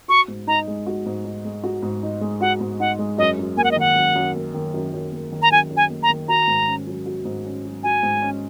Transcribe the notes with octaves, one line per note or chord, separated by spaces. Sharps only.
F#4 C#6
G#2
D#4 A#5
G#3
F#4
G#2
D#4
G#3
F#4
G#2
D#4
G#3
F#4 F#5
G#2
D#4 F#5
G#3
F#2 D#5
F#2
A#3 G#5
F#5
D#5
D#3 F#5
F#2
F#2
A#3
D#3
F#2
F#2
A#3
D#3
A#5
F#2 G#5
F#2
G#5
A#3
A#5
D#3
F#4 A#5
G#2
C#4
F#3
F#4
G#2
C#4
F#3
F#4 G#5
G#2
C#4